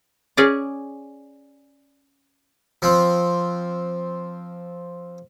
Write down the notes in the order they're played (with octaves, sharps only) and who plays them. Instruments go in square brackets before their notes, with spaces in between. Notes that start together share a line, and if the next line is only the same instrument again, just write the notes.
[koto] C#4 G#4 D5
[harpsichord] F3 C4